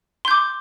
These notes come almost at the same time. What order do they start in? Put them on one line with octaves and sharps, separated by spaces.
C6 G6 D6